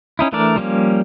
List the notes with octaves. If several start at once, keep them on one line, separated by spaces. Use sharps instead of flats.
C#4 D#4 E4
E3 A3 D4 A#4 D5
F3 G3 A#3 C#4